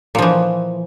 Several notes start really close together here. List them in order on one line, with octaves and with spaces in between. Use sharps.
A#2 F3 E3